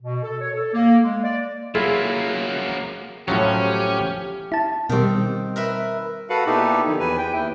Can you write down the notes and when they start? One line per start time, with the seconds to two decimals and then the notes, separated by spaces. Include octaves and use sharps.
0.02 B2
0.23 A4
0.41 C#5
0.54 A4
0.74 A#3
1.04 G#3
1.24 D5
1.75 F#3 A#3 E4 F4 G#4
3.28 A2 F3 F#3 C#4 G4
4.52 E4 A5
4.89 B2 D#3 G3 C4
5.56 A#4 B4 E5
6.30 F#4 A4 B4 F5 F#5
6.46 A#2 B3 D#4 E4 G4 A4
6.87 D3 D#3 F3 D#4
7.00 E2 B4 G#5
7.18 G5
7.33 D#2 E4